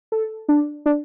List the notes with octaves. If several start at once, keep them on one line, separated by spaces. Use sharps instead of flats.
A4
D4
D4